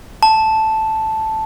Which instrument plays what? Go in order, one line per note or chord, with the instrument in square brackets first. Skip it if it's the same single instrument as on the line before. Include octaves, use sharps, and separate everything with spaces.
[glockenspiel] A5